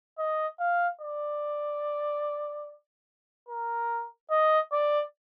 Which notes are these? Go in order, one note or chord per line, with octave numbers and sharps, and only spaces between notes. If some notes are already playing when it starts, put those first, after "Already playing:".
D#5
F5
D5
A#4
D#5
D5